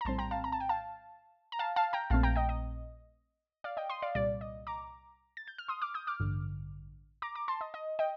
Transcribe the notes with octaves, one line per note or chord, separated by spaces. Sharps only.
A#5
A#1 A2 G3 C4 A5 C6
G5 A#5
F5 A5
A#5
A5
G5
F5 A5
A#5
F5 A5
F5 A5
G5 A#5
A#1 A#2 A3 C4 F5 A5
G5 A#5
D#5 G5
D#5
D5 F5
D#5 G5
C6 D#6
D5 F5
C2 A#2 G3 D5
D#5
A#5 D6
A6
G6
F6
C6 D#6
D6 F6
D#6 G6
D6 F6
A1 G2 D3
A#5 D6
A#5 D6
A5 C6
D#5
D#5
D#5 G5